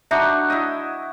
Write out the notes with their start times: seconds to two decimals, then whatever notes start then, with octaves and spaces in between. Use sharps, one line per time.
0.11 D4 D#4 F#4 E5 F#5
0.50 E4 D#5